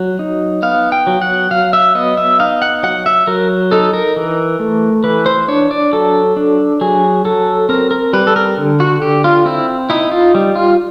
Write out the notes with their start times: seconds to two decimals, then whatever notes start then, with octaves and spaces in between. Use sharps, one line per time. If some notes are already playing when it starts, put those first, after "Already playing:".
Already playing: F#3
0.19 D#4
0.63 B3 F5
0.92 G5
1.07 F#3
1.22 F#5
1.51 F#3 F5
1.73 E5
1.95 B3 D#5
2.17 E5
2.40 D#4 F5
2.62 F#5
2.83 F#3 F#5
3.06 E5
3.27 F#3 A#4
3.71 D#4 A4
3.94 A#4
4.16 E3
4.60 A3
5.04 E3 B4
5.26 C5
5.48 D4 C#5
5.71 D5
5.93 F#3 A4
6.36 D4
6.81 F#3 G#4
7.25 F#3 A4
7.69 C4 A#4
7.91 A#4
8.13 G3 B4
8.27 A4
8.36 A#4
8.57 D3
8.80 F#4
9.02 D3 G4
9.24 F4
9.45 C4 E4
9.90 D#4 E4
10.11 F4
10.35 G3
10.56 F4